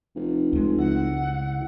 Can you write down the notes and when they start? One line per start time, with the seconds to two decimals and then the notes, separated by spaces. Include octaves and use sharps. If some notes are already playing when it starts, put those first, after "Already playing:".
0.16 F1
0.53 C#2 G#3
0.79 C#3 E4 F#5